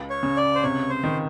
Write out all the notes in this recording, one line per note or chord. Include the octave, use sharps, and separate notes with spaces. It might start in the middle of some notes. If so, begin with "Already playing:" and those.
Already playing: C#2
C#5
C#3
D5
C5
C3 C#5
C5
D#3